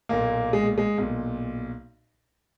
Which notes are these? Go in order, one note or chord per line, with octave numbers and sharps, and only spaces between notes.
B1 A#2 A#3
G#3
G#3
B1 A#2